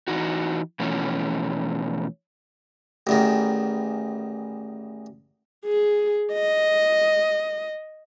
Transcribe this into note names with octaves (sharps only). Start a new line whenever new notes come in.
E3 D#4 F#4
B2 E3 F3 A3 C#4
A1 E2 D#3
G#4
D#5